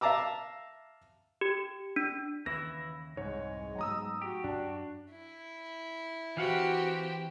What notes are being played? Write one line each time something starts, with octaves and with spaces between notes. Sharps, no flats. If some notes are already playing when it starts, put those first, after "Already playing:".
E5 F5 A5 A#5 D6 E6
G4
D4
D#2 C#3 E3 E4 A#6
C2 F2 G#2 G#3 C#5
F#3 A3 B3 A#5 D#6 E6
F#4 G4
F#2 D4
E4
E3 C4 F#4 G4 F5 F#5